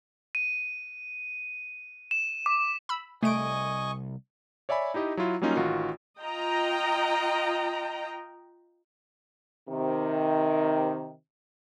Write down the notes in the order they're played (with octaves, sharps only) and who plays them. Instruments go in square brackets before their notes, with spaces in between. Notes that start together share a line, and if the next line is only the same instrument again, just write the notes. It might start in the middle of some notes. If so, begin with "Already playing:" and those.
[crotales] D#7
E7
D6
[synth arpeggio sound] B5 E6
[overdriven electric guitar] C2 [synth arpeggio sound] A3 D7 [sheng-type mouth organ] D#5 G#5 C#6
[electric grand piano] C#5 D5 E5 G#5 B5
D#4 E4 G4 D#5
F#3 E4 F4
F#3 G3 A#3 C#4 D#4 F4
A1 D#3 F4 F#4
[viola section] F4 D#5 G5 A#5
[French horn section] C3 D#3